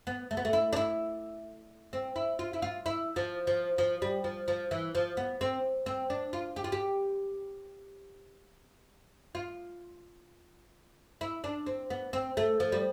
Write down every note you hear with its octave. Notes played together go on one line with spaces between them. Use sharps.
B3
A3
B3
A3
E4
D4
E4
C4
E4
F4
E4
F4
E4
F3
F3
F3
G3
F3
F3
E3
F3
B3
C4
C4
D4
F4
G4
F4
G4
F4
E4
D4
C4
B3
C4
A3
F3
G3